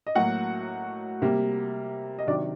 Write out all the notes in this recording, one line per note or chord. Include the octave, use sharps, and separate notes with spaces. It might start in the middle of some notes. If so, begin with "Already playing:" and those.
D#5
A2 F#3 A#3 F#4 F#5
C3 G3 A#3
D#5
C3 D#3 F#3 D4 D5